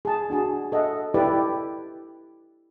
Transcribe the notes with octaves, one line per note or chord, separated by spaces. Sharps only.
G#4 A5
D4 F#4 G#4
A4 D#5 E5 F#5
E4 G4 A4 B4 D5